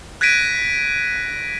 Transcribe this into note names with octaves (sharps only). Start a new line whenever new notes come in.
F#6 G#6 A#6 B6 D7 D#7